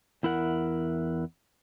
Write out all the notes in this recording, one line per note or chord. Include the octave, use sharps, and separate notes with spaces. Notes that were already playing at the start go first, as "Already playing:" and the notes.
E2 E4 A#4 F#5